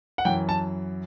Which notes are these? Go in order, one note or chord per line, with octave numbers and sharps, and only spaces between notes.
F#5
F#2 E3 G5
A5